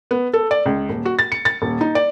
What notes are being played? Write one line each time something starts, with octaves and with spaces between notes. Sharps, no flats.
B3
A4
D5
C#2
D#1
F#4
A6
C#7
A6
D#1
D#4
D5